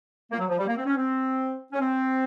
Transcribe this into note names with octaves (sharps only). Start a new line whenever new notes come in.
A#3
F#3
F3
G3
A#3
C4
C#4
C4
C#4
C4